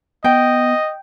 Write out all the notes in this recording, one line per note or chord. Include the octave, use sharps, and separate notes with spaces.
B3 D#5 G5